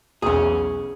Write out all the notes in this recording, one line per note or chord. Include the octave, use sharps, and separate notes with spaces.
B1 E2 C#4 G#4